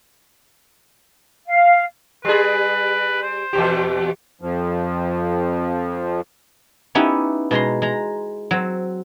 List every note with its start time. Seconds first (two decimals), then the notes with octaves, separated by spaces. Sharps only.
1.48 F5
2.25 G3 G#4 B4
3.22 C5
3.53 E2 B2 G4
4.41 F2 F3
6.95 B3 C#4 D#4 E4 G4 B4
7.51 B2 G#3 A#5 C6
7.82 G#3 A#5
8.51 F#3 C4